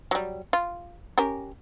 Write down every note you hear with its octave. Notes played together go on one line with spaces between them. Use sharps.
F#3 G3
F4
C#4 G4 A#4